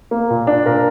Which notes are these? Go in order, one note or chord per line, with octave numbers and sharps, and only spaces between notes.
A#3
A#2
D4
A#2 A#4